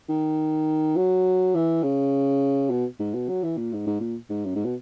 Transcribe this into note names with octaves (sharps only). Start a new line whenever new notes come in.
D#3
F#3
E3
C#3
B2
G#2
B2
F#3
E3
A#2
G#2
G#2
A#2
G#2
F#2
G#2
B2